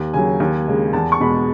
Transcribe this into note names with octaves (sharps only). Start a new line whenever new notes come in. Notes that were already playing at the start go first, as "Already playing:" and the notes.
Already playing: D#2
C#3 F#3 G#5
D#2
C#3 G#3
E2 A5
C#6
B2 G#3 B5